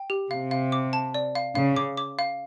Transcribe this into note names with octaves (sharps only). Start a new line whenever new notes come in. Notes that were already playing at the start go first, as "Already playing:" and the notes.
Already playing: G5
G4
C3 F5
F5
D6
A5
D5
F5
C#3 F5
D6
D6
F5